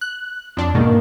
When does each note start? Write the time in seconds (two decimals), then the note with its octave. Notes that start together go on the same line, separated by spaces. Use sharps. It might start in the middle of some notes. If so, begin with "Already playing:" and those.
0.01 F#6
0.57 F2 D4
0.74 G#2 B2 D#3 A#3